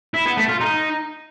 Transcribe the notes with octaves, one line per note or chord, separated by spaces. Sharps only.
E4
B3
A3
F4
D#4